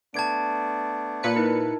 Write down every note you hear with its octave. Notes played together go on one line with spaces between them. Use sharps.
A3 B3 D4 A5 G#6 D7
A#2 B4 C#7
D#4 E4 A#4